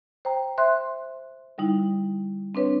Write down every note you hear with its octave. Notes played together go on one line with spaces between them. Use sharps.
C5 G5 A#5
C5 E5 C6 F#6
D3 G3 D#4 E4
C4 D4 B4 C#5